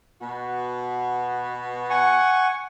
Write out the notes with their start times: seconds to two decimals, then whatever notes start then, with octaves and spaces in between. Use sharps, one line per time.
0.21 B2 B3 F#4
1.90 F#5 G#5 C#6